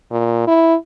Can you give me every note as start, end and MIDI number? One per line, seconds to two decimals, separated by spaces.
0.11 0.44 46
0.47 0.75 64